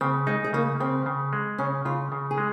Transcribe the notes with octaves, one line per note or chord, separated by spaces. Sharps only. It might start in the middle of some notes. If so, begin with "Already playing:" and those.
C#3 C4
G#3 D#4
G#3
C#3 A#3
C#3 C4
C#3
G#3
C#3 C#4
C#3 F4
C#3
G#4
G#3